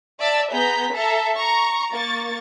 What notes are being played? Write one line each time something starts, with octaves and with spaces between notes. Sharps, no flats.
D5 E5 A5 E6 A6
B3 G#4 A#5 G6 B6
A4 E5 A5 A#5
A#5 C#6
A#3 C#6 A6